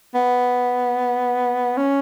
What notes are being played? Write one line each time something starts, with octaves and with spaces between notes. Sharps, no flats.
B3
C#4